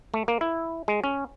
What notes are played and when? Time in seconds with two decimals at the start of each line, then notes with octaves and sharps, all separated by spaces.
0.14 A3
0.28 A#3
0.41 E4
0.88 G#3
1.04 C#4